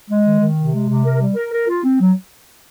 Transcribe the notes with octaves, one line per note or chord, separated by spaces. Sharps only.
G#3
D#3
D#3
C3
G#3
C3
A#4
G3
A#4
A#4
F4
C4
F#3